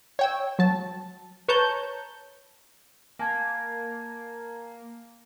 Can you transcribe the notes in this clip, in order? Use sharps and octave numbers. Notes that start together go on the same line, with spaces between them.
C#5 G5 E6
F#3 A5
B4 C#5 A5 A#5 G6
A#3 G#5 A5 G#6